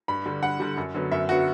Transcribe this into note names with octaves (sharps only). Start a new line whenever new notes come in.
G2 B5
D3 G3
G2 F#5
D3 G3
F#2
D3 F#3 B3
F#2 E5
D3 F#3 B3 F#4